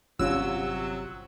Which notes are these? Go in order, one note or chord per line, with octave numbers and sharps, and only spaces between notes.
G1 C3 F#3 G3 C#4 F4 E6